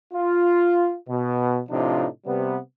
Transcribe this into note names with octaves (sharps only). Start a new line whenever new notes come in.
F4
B2
A2 C3 F3 D4 D#4 F4
C3 G3 B3